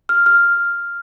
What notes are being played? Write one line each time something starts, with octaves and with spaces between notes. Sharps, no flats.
F6
F6